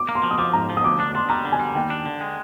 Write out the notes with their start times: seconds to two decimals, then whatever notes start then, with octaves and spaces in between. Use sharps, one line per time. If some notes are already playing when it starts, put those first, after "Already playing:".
Already playing: D6
0.09 A#3
0.15 C6
0.23 F3
0.31 D#6
0.38 F3 D6
0.53 G#2 A#5
0.70 F3
0.77 D#6
0.84 D2 D6
0.99 D4 D6
1.15 D4 C6
1.29 G3 A#5
1.45 D3
1.52 G#5
1.60 G3
1.75 D#2 G5
1.90 D4
2.05 D3
2.21 G#3